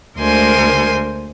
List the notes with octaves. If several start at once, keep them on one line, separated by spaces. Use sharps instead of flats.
D2 G#3 A#4 C5 G#5 C6